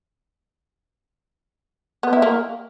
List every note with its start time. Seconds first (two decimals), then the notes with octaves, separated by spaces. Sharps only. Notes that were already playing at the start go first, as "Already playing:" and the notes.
2.03 B3
2.13 E4
2.22 A#3